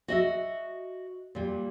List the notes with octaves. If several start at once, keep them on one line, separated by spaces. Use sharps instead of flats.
F#4 D#5 E5
A#2 G3